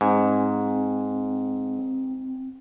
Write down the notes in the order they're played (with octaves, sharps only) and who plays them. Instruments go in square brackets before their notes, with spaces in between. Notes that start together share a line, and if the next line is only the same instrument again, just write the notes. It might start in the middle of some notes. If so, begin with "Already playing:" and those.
[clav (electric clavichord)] G#2 [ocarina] C4 [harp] G#5